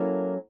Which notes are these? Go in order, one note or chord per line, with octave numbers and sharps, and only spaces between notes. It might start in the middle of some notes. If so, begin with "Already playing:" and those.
Already playing: F#3 A#3 C#4 E4 A4